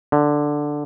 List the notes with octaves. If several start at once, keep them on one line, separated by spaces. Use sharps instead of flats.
D3